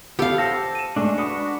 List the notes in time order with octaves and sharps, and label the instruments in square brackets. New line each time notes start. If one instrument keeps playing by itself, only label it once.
[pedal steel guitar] B3 A4 [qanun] G4 F5
[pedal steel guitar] C5 A5 E6 [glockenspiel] A#6 C#7
[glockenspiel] D#7 E7
[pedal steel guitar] G#3 A3 D4
[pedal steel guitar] D4 F#4 B4 [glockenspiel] B5 D#6 C#7